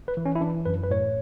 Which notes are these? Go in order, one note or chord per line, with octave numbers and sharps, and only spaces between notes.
B4
E3
C#4
E4
E3 D4
F#2 B4
B4
A2 C#5